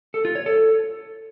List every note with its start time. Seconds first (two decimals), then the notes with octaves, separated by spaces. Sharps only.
0.14 A4
0.25 F4
0.35 C#5
0.46 A4